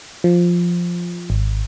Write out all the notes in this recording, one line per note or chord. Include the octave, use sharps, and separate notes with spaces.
F3
G#1